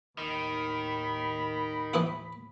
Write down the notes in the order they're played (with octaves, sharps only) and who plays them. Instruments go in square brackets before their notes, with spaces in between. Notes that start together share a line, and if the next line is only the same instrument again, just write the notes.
[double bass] D#2 A2 [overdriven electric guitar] D#3 [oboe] B5
[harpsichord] E3 D#4 E4